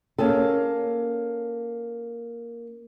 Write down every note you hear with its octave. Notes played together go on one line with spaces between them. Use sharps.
A#3 C#4 G#4 A4